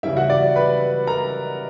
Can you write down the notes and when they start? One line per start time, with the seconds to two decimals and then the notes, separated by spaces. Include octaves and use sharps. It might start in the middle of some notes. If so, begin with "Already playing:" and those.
0.03 C#3 E3 G3 E4 E5
0.17 F#4 F#5
0.30 D5
0.56 B4 B5
1.07 A#4 A#5